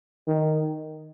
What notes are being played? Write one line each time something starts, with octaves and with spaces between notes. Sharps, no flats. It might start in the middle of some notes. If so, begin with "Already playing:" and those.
D#3